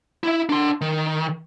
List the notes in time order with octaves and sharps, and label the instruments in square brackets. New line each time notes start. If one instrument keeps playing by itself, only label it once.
[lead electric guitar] E4 E5
D4 C6
D#3